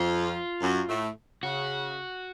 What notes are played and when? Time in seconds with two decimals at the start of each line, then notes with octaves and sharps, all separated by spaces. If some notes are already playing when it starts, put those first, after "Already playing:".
Already playing: F2 F3 F4
0.62 F#2 F#3
0.89 A2 A3
1.43 C#3 F#4